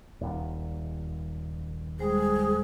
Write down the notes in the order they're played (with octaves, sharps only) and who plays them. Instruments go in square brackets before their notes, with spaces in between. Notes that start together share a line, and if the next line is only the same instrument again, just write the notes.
[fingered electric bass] D#1
[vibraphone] G3 G#3 C5 [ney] G#4